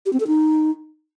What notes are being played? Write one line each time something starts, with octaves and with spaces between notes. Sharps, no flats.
G4
C4
A4
D#4